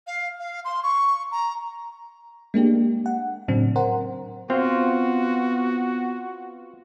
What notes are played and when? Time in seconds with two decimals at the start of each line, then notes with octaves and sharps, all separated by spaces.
0.07 F5
0.39 F5
0.65 C6
0.83 C#6
1.31 A#5
2.54 G#3 A#3 D4 G4
3.06 F#5
3.48 A2 C#3 F#3 C4 D4
3.76 A#4 C5 F#5
4.50 B3 C4 F4 F#4